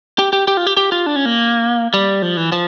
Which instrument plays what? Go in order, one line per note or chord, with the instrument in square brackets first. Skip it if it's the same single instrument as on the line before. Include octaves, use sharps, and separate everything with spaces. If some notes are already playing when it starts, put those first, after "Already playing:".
[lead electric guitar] G4
G4
G4
F4
G4
G4
F4
D4
C#4
A#3
G3
F3
E3
F3